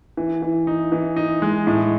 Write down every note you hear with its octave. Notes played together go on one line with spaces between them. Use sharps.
E3
E3
D#4
E3
D#4
G#3
A2